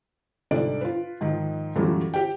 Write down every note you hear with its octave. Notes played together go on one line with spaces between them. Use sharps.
C2 G#2 D4 A4 D5 D7
F4 B4
G#2 D#3 F3
F#2 A#2 E3 F#3 G3 A3
G4 G5